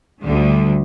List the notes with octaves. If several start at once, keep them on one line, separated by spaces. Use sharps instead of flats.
D2 D3 G3